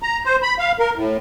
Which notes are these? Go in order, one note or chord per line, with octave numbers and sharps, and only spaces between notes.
A#5
C5
B5
F5
A#4
A2